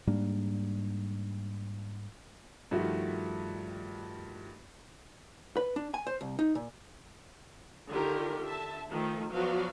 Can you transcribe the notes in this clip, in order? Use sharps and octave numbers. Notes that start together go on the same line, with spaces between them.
G#2 G3 A#3 D4
G2 D#3 F3 A3 F#4
B4
D4
G#5
C5
C2
D#4
A#2
D3 D#3 F4 G4 A#4
D3 E5 A5
D#3 F3 A3 A4
F3 F#3 B3 F#4 D5 F5